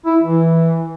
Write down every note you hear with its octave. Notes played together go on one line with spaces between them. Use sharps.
E4
E3